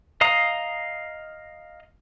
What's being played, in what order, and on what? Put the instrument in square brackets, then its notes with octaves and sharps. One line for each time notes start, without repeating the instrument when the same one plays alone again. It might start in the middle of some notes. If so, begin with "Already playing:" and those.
[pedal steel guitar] D#5 F5 A#5 D#6